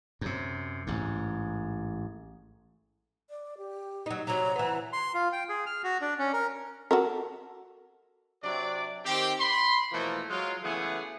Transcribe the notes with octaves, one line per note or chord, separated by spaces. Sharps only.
F#2 C3
A1 G#2
D5
G4
F#3 D#4
C3 F#3 C#5 A#5
E3 B3 F#5
C6
F4
G5
G#4
F6
F#4
D4
C#4
A#4
F#4 A4 A#4
C3 F#3 D4 D5
D#3 C4 G4
B5 C6
B2 E3 F3 A3 A#3
F#3 G#3 F4
C#3 E3 A3 B3 G#4